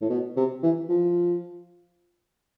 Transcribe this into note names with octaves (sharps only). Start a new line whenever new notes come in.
A2
B2
C3
E3
F3